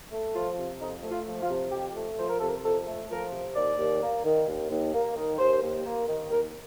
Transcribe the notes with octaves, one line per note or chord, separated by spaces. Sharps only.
A3
F3 F4
C3
F2 D#4
A3
F4
F3
F4
C3
F2 G4
A3
F3 C5
A#4
C3 A4
A#4
F2 A4
A3
F3 A#4
C3
D#2 D5
D#2
A#3
D#3
D#2
D#2
A#3
D#3
D#2 C5
D#2
A#3
D#3
D#2 A#4